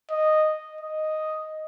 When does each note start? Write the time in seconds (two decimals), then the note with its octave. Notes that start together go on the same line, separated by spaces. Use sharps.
0.11 D#5
0.81 D#5